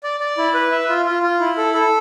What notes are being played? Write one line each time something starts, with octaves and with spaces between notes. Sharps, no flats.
D5
D5
E4
B4
E5
F4
F4
F4
E4
A4
A4